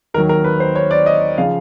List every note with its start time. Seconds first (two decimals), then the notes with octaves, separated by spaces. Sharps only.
0.14 D#2 D#3 F#3 A#4
0.29 A#4
0.44 B4
0.60 C5
0.75 C#5
0.91 D5
1.06 D#5
1.38 C#3 F3 F5